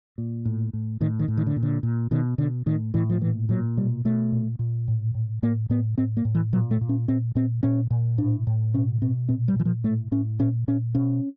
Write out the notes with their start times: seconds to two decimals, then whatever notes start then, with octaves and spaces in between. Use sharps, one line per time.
0.18 A#2
0.45 A2
0.73 A2
1.01 A2 D#3
1.19 D#3
1.28 A2
1.37 D#3
1.47 D3
1.56 A#2
1.63 D3
1.83 A#2
2.11 B2 D#3
2.38 B2 D3
2.66 A2 D#3
2.94 A2 E3
3.10 F3
3.21 A#2 E3
3.49 A#2 F#3
3.77 B2 G3
4.05 B2 A3
4.32 A#2
4.59 A#2
4.88 A2
5.14 A2
5.43 A2 A#3
5.70 A2 B3
5.98 A2 C4
6.17 A#3
6.25 A2
6.35 E3
6.53 A#2 F#3
6.71 A3
6.81 A#2
6.89 C#4
7.08 A#2 C4
7.35 A#2 C4
7.63 A#2 C#4
7.90 A#2
8.18 A2 D4
8.47 A2
8.74 B2 C#4
9.02 B2 C4
9.29 A#2 C4
9.48 G3
9.56 A#2 E3
9.65 F3
9.84 A2 A3
10.11 A2 C#4
10.39 A#2 C#4
10.68 A#2 C#4
10.95 B2 C#4